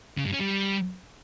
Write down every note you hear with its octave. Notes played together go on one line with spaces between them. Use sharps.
C#3
G2
C#4
G3